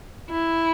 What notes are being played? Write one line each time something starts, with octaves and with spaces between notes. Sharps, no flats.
E4